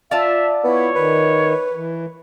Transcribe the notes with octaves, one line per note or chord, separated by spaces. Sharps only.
F4 D5 E5 A5
B3 E4 C#5
D#3 B4
E3